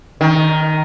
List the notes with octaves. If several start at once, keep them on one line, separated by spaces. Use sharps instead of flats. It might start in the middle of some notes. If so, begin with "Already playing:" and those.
D#3